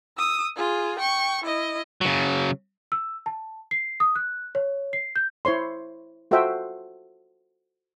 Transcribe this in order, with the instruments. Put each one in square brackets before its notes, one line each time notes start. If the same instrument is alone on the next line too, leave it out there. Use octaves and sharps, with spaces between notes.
[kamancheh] D#6 E6
F4 G#4
G5 C#6
E4 D#5
[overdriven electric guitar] C#3 F#3
[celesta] E6
A5
C7
D#6
F#6
C#5
C7
G6
[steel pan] E4 C5 C#5 C6
F4 F#4 A4 C5 E5 G5